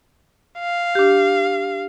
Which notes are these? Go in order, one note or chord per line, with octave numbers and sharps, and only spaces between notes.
F5
D4 G4